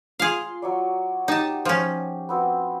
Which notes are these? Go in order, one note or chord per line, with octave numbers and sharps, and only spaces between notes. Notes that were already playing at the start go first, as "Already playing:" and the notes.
F4 G#4 F5 C6
F#3 C#5 D5
D#4 G4 A5
F3 C#4
B3 C4 F#4